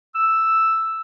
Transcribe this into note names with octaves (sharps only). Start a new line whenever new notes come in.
E6